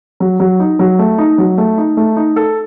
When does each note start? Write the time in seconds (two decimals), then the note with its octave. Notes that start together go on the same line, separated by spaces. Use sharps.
0.20 F#3
0.40 F#3
0.60 D#4
0.79 F#3
0.99 A3
1.18 D#4
1.38 F#3
1.58 A3
1.78 D#4
1.97 A3
2.16 D#4
2.36 A4